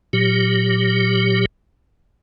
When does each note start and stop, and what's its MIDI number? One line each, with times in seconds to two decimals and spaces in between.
0.13 1.45 46
0.13 1.45 54
0.13 1.45 67